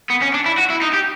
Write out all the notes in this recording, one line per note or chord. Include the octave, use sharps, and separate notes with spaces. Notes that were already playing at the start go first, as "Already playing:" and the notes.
B3
C#4
D4
E4
F#4
E4
D#4
G4